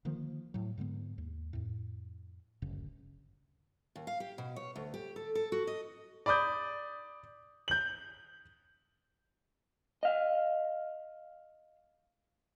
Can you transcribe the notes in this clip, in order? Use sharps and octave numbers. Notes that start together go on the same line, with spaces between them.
D3 D#3 F3 A#3
A2 F#3
G#2 D3 G#3 B3
D#2
F2 A2
D1 G1 F#2 C#3
D#2
F5
G4
B2
C#5
D2
G4
A4
A4
F#4
D#5
D5 B5 D6 D#6 G6
G6 F#7
D#5 F5